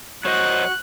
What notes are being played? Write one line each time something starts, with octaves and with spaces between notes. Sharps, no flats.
F#3 F#4 C5 D#5 C#6 F#6